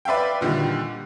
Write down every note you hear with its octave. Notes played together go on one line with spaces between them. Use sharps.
B4 D5 E5 F5 G5
A#2 D3 D#3 G3